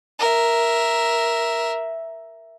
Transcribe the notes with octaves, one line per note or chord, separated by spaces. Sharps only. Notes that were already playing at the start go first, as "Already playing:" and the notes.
A#4 E5